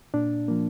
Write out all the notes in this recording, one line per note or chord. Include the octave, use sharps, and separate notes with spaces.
A#2 D4
F3 A#3